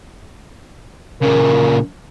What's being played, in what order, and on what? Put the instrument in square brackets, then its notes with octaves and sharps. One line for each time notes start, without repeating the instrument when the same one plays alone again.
[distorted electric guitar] A#2 C#3 [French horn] A#4